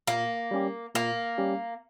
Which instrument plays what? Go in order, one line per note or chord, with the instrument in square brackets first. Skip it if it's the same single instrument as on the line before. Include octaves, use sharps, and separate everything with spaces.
[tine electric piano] A#2 [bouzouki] A#3
[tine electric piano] G3 C#4 G4
[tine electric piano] A#2 [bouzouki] A#3
[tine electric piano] G3 C#4 G4